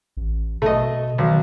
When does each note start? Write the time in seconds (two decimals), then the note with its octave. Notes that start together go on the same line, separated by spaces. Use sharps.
0.17 A1
0.62 B2 A3 D#5
1.18 B1 D#3